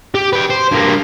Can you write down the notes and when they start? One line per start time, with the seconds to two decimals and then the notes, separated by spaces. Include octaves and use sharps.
0.15 G4
0.33 B4 G5
0.50 C5
0.72 G2 A#3